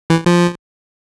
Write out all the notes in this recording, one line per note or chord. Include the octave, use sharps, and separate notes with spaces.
E3
F3